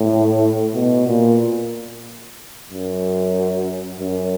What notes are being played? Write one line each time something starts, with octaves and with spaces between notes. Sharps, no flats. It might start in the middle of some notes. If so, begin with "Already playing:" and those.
Already playing: A2
B2
A#2
F#2
F#2